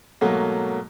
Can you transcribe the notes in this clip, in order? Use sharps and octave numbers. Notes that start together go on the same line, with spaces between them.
G#2 B2 F#3 A3 A#3